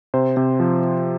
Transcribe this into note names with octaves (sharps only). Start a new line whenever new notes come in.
C3 C5
C3
F3